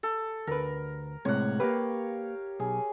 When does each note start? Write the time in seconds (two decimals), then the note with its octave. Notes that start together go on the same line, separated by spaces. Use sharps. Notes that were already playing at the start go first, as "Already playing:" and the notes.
0.03 A4
0.47 D2 A#4 B4
1.25 A2 C3 G#3 C#5 F#5
1.60 A#3 G4 B4 F5
2.60 B1 G#4